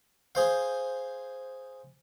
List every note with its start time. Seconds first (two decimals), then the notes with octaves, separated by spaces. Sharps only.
0.35 G#4 C5 F5